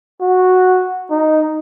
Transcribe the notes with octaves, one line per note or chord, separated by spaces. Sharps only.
F#4
D#4